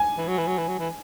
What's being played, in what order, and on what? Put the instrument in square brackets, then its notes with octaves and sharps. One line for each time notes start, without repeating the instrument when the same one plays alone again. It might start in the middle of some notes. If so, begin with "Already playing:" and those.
Already playing: [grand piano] G#5
[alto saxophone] E3
F#3
E3
F#3
E3
F#3
E3